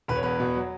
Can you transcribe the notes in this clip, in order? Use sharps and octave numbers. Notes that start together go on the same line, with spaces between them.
E1 B4
C#5
E2 B4
B2
F#3